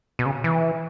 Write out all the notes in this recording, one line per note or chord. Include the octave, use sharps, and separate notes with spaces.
B2
C#3
E3